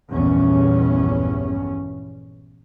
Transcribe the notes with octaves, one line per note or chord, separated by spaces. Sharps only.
A#1 E2 G2 C#4